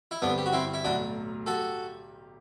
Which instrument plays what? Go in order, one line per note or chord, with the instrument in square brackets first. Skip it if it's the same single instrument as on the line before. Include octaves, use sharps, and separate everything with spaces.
[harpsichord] E4
[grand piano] G2 D3 G3 C4 [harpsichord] B3 D4
[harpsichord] G4
F#4
C4 E4
E4
[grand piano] B1 A2 F#3 [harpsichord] D4 F#4
[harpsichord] F#4 A4 [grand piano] G4